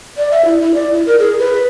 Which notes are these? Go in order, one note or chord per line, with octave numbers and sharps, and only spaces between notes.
D5
E5
E4
E4
D5
E4
A#4
G#4
B4